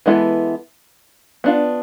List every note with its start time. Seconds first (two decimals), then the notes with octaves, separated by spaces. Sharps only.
0.06 E3 G#3 B3 E4 A4
1.44 B3 D4 F4